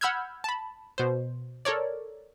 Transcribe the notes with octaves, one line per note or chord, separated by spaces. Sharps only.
F#5 B5 E6 F6 G6 G#6
A5 B5
B2 C5
A4 A#4 C#5 D5